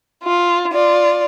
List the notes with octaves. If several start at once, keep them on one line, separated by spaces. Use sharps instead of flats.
F4
F4 D5